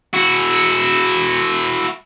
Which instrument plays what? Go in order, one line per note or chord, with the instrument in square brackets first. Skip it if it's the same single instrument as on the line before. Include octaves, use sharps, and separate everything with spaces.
[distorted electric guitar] E4 F#4